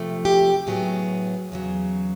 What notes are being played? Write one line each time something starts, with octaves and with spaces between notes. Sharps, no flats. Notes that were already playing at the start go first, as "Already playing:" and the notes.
Already playing: D2 C3 F3 A3
G4
A2 F#3 B3 G#4
E2 C#3 F#3